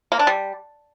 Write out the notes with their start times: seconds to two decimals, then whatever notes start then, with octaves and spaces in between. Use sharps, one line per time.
0.12 A#3
0.19 D4
0.27 G3